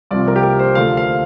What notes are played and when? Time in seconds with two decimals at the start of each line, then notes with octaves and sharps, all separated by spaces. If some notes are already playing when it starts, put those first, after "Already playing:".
0.11 C2 C3 F3 D5
0.28 A#4
0.36 G4
0.43 A#4
0.59 C5
0.75 D2 D3 F3 F5
0.97 F5